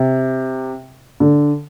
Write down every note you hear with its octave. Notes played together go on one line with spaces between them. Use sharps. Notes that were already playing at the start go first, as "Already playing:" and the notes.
Already playing: C3
D3